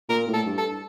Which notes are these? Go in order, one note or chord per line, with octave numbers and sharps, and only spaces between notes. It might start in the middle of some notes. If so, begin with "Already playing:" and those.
A#2 A#4
A2
A4
G2
A4